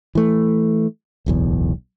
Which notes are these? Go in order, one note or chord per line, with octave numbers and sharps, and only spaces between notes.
E3 A3
D1 B1 E2